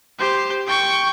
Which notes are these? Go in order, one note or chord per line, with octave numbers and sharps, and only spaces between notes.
G4 C5
G5 C#6